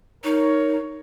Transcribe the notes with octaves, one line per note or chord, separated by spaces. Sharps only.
D#4 A#4 C#5